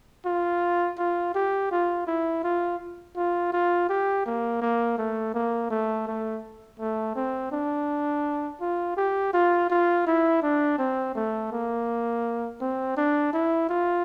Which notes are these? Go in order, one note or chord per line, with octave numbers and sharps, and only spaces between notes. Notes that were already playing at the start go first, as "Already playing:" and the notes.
F4
F4
G4
F4
E4
F4
F4
F4
G4
A#3
A#3
A3
A#3
A3
A3
A3
C4
D4
F4
G4
F4
F4
E4
D4
C4
A3
A#3
C4
D4
E4
F4